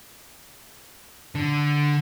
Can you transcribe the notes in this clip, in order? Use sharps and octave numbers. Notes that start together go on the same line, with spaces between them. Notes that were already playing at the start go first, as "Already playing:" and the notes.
D3